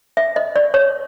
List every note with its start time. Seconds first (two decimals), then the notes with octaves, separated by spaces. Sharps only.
0.17 E5
0.36 D#5
0.56 D5
0.74 C#5